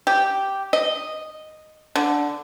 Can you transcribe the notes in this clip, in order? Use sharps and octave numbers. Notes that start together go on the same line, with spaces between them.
G4
D#5
D3